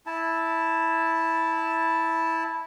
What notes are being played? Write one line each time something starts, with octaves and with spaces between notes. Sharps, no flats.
E4 A5